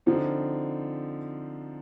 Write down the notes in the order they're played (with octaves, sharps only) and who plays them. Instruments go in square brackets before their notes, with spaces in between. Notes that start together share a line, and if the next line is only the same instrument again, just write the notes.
[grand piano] D3 F3 C4 D#4